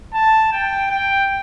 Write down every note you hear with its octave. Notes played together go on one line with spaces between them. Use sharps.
A5
G5
G5